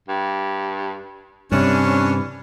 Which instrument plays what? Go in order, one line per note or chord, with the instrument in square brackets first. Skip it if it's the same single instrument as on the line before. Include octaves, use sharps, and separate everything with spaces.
[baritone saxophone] G2
[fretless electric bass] G2 C3 [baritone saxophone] E3 [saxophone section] C#4 D4